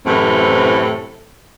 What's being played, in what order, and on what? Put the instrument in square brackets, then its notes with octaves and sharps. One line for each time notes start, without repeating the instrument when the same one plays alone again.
[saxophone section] F#2 A2 C3 E3 C4 A4